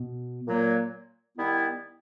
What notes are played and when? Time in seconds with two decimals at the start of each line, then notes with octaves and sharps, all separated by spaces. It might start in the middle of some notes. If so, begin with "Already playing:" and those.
Already playing: B2
0.48 A#2 F#3 A#3
1.37 D#3 G3 B3 E4